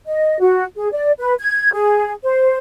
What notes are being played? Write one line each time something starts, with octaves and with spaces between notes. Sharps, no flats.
D#5
F#4
G#4
D5
B4
G#6
G#4
C5